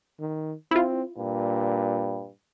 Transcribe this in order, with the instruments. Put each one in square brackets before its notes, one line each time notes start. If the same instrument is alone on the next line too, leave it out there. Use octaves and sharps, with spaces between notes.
[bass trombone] D#3
[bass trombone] C4 [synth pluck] E4 F4
[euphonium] G2 [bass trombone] A#2